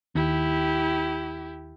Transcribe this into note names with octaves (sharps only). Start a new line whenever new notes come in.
D#2 E4 G4